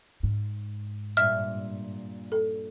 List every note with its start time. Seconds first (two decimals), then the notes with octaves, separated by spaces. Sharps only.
0.23 G#2
1.17 G2 A#2 E5 F6
2.32 A4